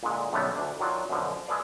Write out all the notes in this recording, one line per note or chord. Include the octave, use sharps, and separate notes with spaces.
A#2 D3 G#3
B1 F#2 D3 G3 A3 B3
D2 D4
D#3 F#3 D4 F4
F#2 B2 D3 F3
G#3 G#4 A4 B4 D5 F5